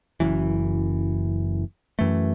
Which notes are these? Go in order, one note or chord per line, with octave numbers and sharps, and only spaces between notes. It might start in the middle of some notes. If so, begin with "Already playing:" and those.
F#1 F#2 E3
F#2 E3 A3